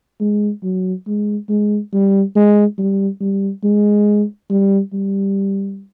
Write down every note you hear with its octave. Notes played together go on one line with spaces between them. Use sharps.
G#3
F#3
G#3
G#3
G3
G#3
G3
G3
G#3
G3
G3